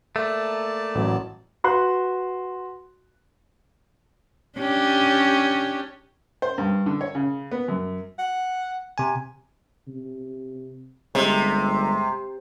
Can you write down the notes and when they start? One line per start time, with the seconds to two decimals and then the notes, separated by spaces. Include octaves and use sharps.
0.16 A3 A#3 D5 A5
0.95 A1 F#3
1.64 F#4 B4 C6 F#6
4.58 C#4 D4 G4
6.42 C5
6.58 G2
6.86 D3
7.01 C#5
7.15 C#3
7.51 B3
7.68 F#2
8.18 F#5
8.98 C3 G#5
9.88 C3
11.15 G1 C3 G#3